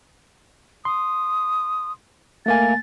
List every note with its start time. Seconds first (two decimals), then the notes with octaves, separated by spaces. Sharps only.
0.85 C6 D#6
2.46 A3 A#3 G#5 A6